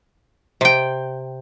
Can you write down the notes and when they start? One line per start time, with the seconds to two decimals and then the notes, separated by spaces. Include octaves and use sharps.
0.61 C3 G5